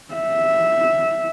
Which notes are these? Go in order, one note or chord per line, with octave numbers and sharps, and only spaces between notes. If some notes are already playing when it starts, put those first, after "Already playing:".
E5